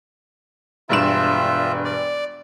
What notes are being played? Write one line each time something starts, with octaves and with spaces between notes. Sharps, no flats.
E1 G2 F4 E5 E7
D5